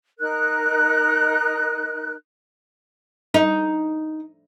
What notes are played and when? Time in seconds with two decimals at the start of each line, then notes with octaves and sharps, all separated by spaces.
0.19 D#4 A#4 F#6
3.34 D#4